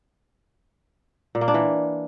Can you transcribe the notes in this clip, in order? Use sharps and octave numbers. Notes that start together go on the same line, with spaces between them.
A#2
A#3
D4
E3